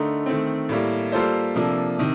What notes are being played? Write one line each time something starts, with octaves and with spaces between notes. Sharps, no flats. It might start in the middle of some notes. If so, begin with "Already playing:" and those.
Already playing: D3 A3 D#4 A#4
D#3 A3 C4
A2 G3 A#3
G3 A#3 F4 A4 C5
C3 F3 A#3 D4 A4
C3 D#3